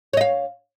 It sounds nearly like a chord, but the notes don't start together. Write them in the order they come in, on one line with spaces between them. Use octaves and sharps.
C#5 D#5 F5